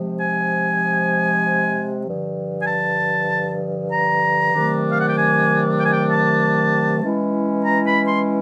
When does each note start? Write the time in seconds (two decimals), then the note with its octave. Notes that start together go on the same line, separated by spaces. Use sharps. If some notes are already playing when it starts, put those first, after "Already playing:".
Already playing: C3 F3 G#3
0.19 G#5
2.05 G2 D3 F3
2.61 G#5
2.67 A5
3.91 A#5
4.53 C3 D#3 F#3 A3 D4
4.91 F5
5.00 F#5
5.07 G5
5.16 G#5
5.78 G5
5.85 G#5
5.93 G5
6.09 A5
7.02 E3 G#3 C#4 E4
7.65 A#5
7.86 B5
8.07 C6